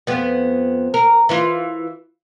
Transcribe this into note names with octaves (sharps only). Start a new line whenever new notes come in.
F2 B3
A#4
E3 E4 F4